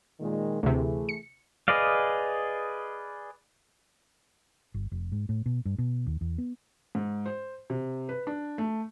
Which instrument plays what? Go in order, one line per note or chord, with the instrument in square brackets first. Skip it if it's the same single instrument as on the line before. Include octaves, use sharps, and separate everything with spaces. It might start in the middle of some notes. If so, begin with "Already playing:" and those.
[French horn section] A#2 D#3 G#3
[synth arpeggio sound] D2 C3 [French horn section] E3 A3 G#4
[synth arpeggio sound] C#7
[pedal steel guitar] G#4 B4 D5 D#5 F5
[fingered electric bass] G1
F1
G#2
A2
B2
G2
B2
D#2
E2
B3
[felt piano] G#2
C5
C3
B4
D4
A3